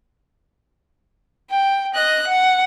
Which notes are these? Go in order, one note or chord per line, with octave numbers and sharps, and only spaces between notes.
G5
D#5 F#6
F#5